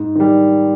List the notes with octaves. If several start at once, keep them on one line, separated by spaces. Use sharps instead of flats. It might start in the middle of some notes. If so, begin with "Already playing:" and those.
Already playing: G#2
D#3 G3